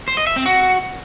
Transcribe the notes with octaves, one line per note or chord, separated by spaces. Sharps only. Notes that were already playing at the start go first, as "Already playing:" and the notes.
C5
D#5
E5
C4
F#4